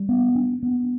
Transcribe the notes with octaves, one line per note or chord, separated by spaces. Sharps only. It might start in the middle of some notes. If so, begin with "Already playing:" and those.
Already playing: G3
B3
D4
B3